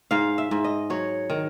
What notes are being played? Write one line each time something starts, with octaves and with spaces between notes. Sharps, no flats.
G#2 F5
E5
G#2
D#5
F#3 C#5
D#3